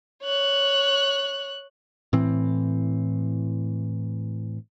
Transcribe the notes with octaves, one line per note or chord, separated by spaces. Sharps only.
C#5 F#6
A2 E3 C4